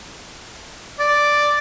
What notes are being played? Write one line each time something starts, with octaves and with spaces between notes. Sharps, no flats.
D5